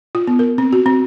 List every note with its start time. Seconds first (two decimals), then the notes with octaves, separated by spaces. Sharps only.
0.15 F4
0.27 B3
0.39 A#4
0.58 C4
0.73 F#4
0.86 C4